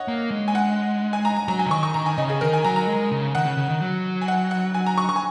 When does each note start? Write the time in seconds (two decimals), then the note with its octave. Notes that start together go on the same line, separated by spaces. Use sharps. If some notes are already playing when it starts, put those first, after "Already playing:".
Already playing: C#5 D#5 F#5
0.08 A#3
0.31 G#3
0.48 G#5
0.55 F#5
1.13 G#5
1.25 A#5
1.37 A#5
1.48 F#3 A#5
1.59 G#5
1.66 C#3
1.71 D#3 C#6
1.83 C#6
1.94 D#3 A#5
2.06 G#5
2.18 C#3 D#5
2.30 G#4
2.41 D#3 A#4
2.53 G#5
2.64 F#3 A#5
2.76 A#5
2.88 G#3
3.12 C#3
3.35 D#3 F#5
3.45 C#3
3.57 C#3
3.69 D#3
3.80 F#3
4.22 G#5
4.28 F#5
4.51 F#5
4.74 G#5
4.87 A#5
4.98 C#6
5.09 C#6
5.16 G#5